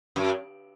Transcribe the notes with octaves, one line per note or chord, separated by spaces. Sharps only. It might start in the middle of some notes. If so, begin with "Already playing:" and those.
F#2